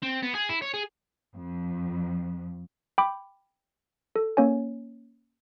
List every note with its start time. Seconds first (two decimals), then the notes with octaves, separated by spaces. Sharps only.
0.02 C4
0.22 B3
0.35 G#4
0.49 E4
0.62 C#5
0.74 G#4
1.35 F2
2.98 G5 B5 D6
4.16 A4
4.37 A#3 C#4 C#5 G#5